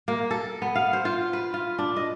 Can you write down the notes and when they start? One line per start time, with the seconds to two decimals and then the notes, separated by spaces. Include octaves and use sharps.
0.08 A#3
0.31 A4
0.62 B3
0.75 F5
0.93 C5
1.05 F4
1.33 B4
1.54 F4
1.78 D4
1.96 D#5